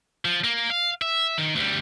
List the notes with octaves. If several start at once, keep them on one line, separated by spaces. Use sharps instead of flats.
F3
A#3
F5
E5
D#3
D2 G3